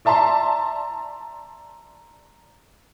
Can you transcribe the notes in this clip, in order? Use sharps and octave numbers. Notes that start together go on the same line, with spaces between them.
D5 E5 A5 A#5 C6